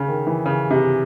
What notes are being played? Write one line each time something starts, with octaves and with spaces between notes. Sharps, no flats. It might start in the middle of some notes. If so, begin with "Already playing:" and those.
Already playing: C#3
D#3
E3
C#3
C3